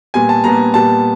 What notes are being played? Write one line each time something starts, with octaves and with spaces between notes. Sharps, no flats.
A#2 G3 B3 G#5
A5
A#2 G3 B3 A#5
A#2 G3 B3 A5